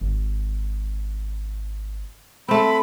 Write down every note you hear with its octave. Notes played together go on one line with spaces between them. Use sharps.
G#1
A3 C4 B5